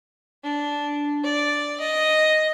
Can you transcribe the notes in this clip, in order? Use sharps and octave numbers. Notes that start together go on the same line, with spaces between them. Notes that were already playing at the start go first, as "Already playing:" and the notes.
D4
D5
D#5